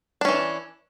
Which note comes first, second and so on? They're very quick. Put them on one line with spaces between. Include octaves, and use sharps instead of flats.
D4 C#4 E3